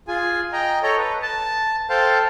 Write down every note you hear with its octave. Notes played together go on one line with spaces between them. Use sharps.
F4 G#4 G#5
D#5 G5 A#5
A4 C#5 D#5 A#5
B4
A5
A4 C5 F5 G5 A5